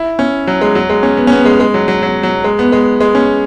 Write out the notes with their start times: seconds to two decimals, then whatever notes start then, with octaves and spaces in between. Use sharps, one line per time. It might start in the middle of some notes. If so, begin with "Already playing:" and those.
Already playing: E4
0.19 C#4
0.47 F#3
0.61 G#3
0.75 F#3
0.90 G#3
1.03 C#4
1.17 B3
1.27 C#4
1.32 B3
1.45 G#3
1.60 G#3
1.74 F#3
1.88 F#3
2.03 F#3
2.23 F#3
2.44 G#3
2.59 B3
2.72 G#3
3.01 G#3
3.15 C#4